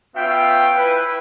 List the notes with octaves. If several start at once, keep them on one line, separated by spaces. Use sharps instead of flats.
B3 C#4 F4 E5 G5
E4 B4